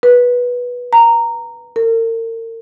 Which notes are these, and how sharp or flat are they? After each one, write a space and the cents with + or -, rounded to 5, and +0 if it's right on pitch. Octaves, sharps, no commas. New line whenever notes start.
B4 -15
A#5 -10
A#4 -40